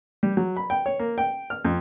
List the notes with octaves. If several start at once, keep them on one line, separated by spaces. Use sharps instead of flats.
G3
F#3
B5
G5
C#5
A#3
G5
F6
F2